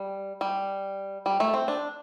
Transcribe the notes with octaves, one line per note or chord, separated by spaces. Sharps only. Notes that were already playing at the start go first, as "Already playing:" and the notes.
Already playing: G3
G3
G3
A3
C4
D4